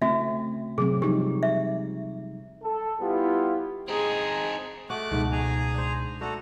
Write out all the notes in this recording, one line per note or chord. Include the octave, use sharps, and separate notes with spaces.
C#3 A3 C4 F#4 E5
C3 F#3 C4 G#4
F3 G3 D#4 G4
E5
A4
G3 B3 E4 F4 G4
C4 D#4 G#4
A3 F#4 D#5 D6 F#6
C#2 G#2 B2 F#4
G#4 G#5 A#5
D4 C5
A3 D4 F#4 A4 A#5